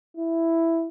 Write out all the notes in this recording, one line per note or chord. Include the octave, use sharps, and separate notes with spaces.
E4